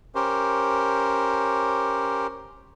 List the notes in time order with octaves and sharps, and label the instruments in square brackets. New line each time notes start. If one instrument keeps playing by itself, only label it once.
[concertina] C#4 G4 A#4 C5